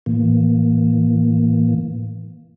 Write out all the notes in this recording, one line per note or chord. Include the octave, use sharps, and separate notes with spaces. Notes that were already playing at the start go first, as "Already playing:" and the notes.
A2 E3 A#3